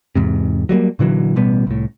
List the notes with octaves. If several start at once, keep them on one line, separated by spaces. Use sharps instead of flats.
E2 G#2 C3
F#3 G3 A3 A#3
A#2 D3 E3 F#3
A1 B2 G3 B3
C2 A2